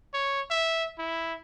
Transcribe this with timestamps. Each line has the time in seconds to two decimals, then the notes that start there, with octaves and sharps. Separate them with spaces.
0.13 C#5
0.50 E5
0.98 E4